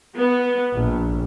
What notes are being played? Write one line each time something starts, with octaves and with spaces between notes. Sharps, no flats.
B3
A#1